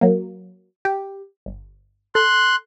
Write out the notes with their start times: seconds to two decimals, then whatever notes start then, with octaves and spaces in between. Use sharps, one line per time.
0.01 F#3 A#3
0.85 G4
1.46 G1
2.15 A4 C6 F#6